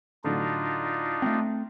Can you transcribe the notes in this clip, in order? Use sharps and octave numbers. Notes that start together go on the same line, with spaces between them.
A2 D3 F#3 D4 D#4 F4
A3 B3 C4